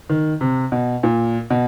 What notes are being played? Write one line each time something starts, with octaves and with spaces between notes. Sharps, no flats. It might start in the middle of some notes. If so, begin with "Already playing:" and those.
D#3
C3
B2
A#2
B2